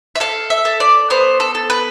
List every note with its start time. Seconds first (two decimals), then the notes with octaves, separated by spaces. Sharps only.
0.16 E5
0.20 A4 F5
0.50 E5
0.65 A4
0.80 D5
1.10 B3 C5
1.40 A4
1.55 A4
1.70 B4